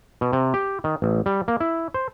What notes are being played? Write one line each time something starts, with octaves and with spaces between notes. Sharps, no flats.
B2
C3
G4
D#3
A1
G3
A#3
E4
C5